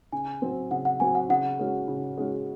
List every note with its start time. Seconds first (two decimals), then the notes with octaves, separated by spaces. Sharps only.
0.12 C#3 G#5
0.42 F#3 C4 F#4
0.71 C#3 F#5
0.85 F#5
1.00 F#3 C4 F#4 G#5
1.15 F#5
1.29 C#3 F#5
1.59 G#3 C#4 F#4
1.88 C#3
2.18 G#3 C#4 F#4